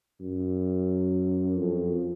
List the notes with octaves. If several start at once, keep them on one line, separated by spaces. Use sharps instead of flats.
F#2
F2